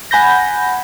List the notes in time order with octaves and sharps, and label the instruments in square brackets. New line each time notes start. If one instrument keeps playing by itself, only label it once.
[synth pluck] F#5 G#5 B5 G6 A#6